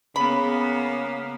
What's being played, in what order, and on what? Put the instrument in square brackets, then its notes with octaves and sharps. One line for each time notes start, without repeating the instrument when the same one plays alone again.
[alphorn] C#3 [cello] A#3 B3 [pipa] B5